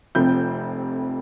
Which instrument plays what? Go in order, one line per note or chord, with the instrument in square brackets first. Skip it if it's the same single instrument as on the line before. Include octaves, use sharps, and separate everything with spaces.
[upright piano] F1 F2 C3 F3 C4 G6